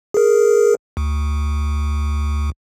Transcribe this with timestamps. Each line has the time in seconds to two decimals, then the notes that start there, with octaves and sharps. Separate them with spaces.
0.14 G#4 A#4
0.97 D2